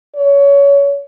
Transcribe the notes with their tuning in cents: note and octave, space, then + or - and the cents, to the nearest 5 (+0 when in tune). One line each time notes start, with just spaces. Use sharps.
C#5 +25